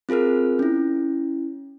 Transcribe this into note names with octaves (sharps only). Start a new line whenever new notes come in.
C4 F4 G#4 A#4 F6
C#4 E4